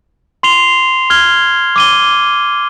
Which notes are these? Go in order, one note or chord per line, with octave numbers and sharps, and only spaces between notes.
C6 C7 F7 G7
F6 G#6 G7
D6 D#7 G7